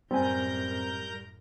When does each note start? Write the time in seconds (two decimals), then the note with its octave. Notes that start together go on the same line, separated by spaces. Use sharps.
0.11 F#2 A2 G3 C4 A#4 G#5 A#5 G6